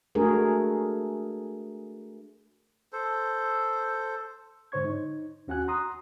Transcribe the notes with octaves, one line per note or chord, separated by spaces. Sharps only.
A3 D4 F#4 G#4 A#4
A4 C5
G#2 D3 C5 C#5 C#6 G#6
D#4
D#2 C#4 F#4 F#5 G#5 F#6
A#5 C6 D#6